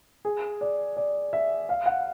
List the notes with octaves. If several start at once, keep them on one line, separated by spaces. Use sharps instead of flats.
G#4
D5
D5
E5
F5
F#5